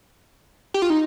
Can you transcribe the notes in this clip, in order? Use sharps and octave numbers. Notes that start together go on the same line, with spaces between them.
G4
F4
D#4